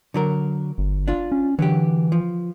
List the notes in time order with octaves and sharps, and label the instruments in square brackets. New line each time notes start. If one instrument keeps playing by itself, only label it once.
[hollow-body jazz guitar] D3 F#3 A#4
[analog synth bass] G1
[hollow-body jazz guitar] D4 F4
[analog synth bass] C#4
[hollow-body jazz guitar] D3 F#3 G4 [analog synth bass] E3
[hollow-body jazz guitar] F3